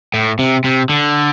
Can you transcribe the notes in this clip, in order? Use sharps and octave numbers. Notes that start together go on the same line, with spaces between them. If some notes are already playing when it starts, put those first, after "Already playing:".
A2
C3
C3
D3